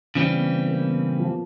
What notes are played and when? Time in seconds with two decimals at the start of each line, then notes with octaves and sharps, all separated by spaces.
0.15 C#3 E3 G3 C4 C#4
0.34 B3
0.50 B3
0.68 A#3
0.85 B3
1.19 F3